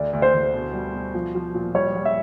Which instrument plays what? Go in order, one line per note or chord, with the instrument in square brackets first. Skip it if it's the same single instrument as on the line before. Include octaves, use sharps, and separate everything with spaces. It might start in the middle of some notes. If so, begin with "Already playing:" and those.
Already playing: [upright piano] D2 [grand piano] D5
[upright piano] D2
[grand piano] C5
[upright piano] D2
B2
G3
B2
F3
F3
A#2
[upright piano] G3 [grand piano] C#5
[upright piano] G3
[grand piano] E5